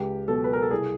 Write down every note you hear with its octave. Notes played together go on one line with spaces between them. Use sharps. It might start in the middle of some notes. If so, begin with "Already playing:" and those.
Already playing: C#2 G4
B2 F#3 A4
B4
A#4
A4
C2 G#4